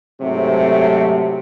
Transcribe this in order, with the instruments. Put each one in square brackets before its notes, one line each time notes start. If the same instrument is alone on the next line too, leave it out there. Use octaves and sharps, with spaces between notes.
[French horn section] G#2 C3 F#3 A3